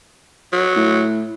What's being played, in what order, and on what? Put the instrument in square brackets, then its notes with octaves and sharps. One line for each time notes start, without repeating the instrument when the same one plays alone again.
[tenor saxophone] F#3
[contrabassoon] A2